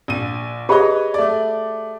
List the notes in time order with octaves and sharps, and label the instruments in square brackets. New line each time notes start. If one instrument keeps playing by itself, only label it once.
[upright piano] A#1 D#7
[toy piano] G4 G#4 B5 [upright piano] B4 C#5 D#5
[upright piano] A3 D5